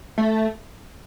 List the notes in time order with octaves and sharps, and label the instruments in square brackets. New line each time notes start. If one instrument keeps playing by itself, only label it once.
[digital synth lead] A3